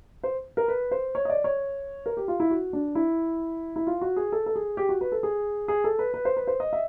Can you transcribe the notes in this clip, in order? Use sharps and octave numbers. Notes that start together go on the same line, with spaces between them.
C5
A#4
B4
C5
C#5
D#5
D5
C#5
A#4
G4
F4
E4
F#4
D4
E4
E4
F4
F#4
G#4
A4
A4
G#4
G4
F#4
B4
A4
G#4
G#4
A4
B4
B4
C5
B4
C5
D#5
E5